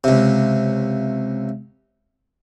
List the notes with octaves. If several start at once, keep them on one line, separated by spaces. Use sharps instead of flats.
C#2 C3